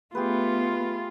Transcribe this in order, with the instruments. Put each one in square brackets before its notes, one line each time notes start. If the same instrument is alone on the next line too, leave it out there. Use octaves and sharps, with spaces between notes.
[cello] A3 B3 [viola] F4 [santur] G4 G#4 B4